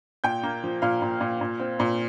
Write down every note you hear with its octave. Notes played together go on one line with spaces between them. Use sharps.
A#2 G5 G6
A#3
F3
A#2 F5 F6
A#2
A#2
A#2
C4
A#2